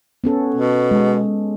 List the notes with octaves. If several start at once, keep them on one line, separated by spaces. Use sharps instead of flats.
B3 C#4 A4
B2
G#3